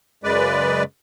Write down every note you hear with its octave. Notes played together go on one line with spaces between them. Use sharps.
F#2 C#3 G#3 B4 D5